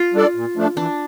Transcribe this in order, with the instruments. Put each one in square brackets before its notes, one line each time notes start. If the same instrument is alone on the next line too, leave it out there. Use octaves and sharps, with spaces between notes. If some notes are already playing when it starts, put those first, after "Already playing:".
Already playing: [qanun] F4
[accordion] G3 D4 A4 D5
A#2
F3 A3 D4
[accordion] E3 [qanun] D4